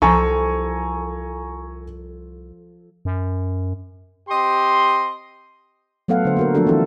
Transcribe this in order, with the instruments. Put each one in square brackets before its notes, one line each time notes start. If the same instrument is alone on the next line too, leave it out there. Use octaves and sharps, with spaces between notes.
[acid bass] C2 [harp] F3 A4 [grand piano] G#5 A#5 C#6
[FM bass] F#2
[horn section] C4 G4 D#5 C6
[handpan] F#3 A3 B3 A4 F5 F#5
D3 C5
A#3 F#4 A#4
F3 A3 D4 F#4 A4
E3 B3 C4 D4 E4 A4